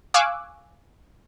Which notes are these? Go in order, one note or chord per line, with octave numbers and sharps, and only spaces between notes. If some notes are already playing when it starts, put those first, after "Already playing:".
F5 G#5 C#6 D6 E6 F#6